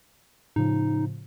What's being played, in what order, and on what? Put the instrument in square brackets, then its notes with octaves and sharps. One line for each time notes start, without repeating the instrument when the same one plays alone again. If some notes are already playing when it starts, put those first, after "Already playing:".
[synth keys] A2 C#3 F3 [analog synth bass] D#4